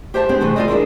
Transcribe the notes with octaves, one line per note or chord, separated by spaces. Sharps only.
G4 C5 E5 A5
G#3 B3 C4 D4
C3 E3 G#3 A3
F4 F#4 A4 D5 D#5
D4 E4 G#4 A#4